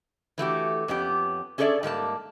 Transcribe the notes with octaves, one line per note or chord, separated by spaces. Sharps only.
E3 A3 F#4 G4
F2 B3 C#4 G4
C#4 G#4 A4 C#5 D5 E5
G#2 G3 A#3 A5